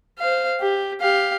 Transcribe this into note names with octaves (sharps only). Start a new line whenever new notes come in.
C5 F5
G4
G4 F5